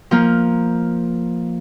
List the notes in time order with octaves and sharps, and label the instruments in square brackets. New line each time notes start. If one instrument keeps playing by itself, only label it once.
[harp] F3 A#3